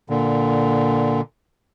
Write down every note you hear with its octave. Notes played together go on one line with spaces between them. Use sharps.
A#2 D3